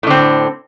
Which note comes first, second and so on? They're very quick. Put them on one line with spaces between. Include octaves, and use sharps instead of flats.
A2 D3 C4